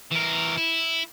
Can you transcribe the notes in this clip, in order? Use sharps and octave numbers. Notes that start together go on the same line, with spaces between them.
E3 A#4
E4